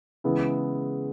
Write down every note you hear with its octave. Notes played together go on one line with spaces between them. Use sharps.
C#3 E3 G#3 B3 E4